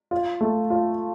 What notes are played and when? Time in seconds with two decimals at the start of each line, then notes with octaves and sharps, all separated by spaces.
0.11 F4
0.41 A3
0.70 F4